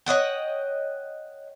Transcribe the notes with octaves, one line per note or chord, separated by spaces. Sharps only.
C#5 D#5 F#5 G5